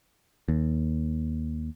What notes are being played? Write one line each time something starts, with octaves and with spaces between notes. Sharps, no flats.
D#2